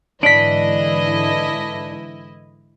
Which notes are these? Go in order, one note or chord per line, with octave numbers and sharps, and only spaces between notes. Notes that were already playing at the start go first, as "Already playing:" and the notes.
G#2 D3 E3 D4 E4 D#5 B6 D7